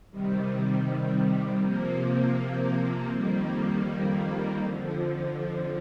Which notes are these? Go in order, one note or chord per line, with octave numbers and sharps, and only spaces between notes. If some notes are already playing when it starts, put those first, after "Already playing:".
C3 D#3 G3
C3 F3 A#3
F2 D#3 G3 A#3
F2 D3 F3